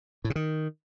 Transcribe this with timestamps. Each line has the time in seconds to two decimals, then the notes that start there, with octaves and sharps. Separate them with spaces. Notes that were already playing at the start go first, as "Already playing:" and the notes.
0.24 A2
0.30 C3
0.35 D#3